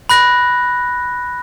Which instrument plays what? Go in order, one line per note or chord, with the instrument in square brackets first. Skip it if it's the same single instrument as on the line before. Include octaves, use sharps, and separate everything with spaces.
[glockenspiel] B5 F#6 A#6